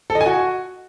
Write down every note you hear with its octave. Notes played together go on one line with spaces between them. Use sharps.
A4
D#5
G#5
F#4